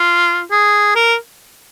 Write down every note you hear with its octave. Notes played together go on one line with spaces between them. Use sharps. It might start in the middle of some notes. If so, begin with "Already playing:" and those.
Already playing: F4
G#4
A#4